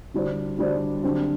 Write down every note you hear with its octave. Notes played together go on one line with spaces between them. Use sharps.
D3 G3 D4 F#4 C5
D3 G3 D4 F#4 C5
D3 F#3 C4 G4